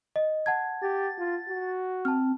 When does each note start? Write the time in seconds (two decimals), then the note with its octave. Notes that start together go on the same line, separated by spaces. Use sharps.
0.16 D#5
0.46 F#5 A5 G#6
0.82 G4 A6
1.18 F4
1.49 F#4
2.05 C4 A5 F6